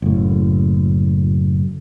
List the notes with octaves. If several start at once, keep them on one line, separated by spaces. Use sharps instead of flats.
F#1 A2